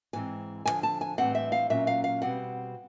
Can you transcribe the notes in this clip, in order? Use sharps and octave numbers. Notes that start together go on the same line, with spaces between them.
G#2 E3 G#3 C4 G#5
D#2 D3 F3 G#5
A5
G#5
A2 E3 G3 C4 F#5
E5
F5
A#2 F#3 A#3 C#4 E5
F5
F5
B2 G3 C4 F#5